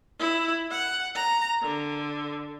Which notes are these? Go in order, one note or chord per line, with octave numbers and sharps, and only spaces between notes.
E4
F#5
A#5
D3